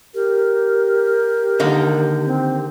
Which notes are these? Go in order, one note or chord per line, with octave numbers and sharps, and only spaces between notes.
G4 A#4
D3 D#3 A#3
C4